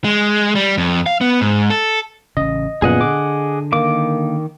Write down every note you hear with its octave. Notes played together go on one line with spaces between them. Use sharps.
G#3
G3
F2
F5
B3
G#2
A4
A1 C#3 D#5
F#2 A#2 C#3 F3 B3 G#4 D#5 F#5
D3 D6
D#3 A#3 D6